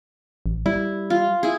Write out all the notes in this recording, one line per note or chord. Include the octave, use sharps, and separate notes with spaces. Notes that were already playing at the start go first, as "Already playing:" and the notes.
A1
G3 E4
F4
E4 G#4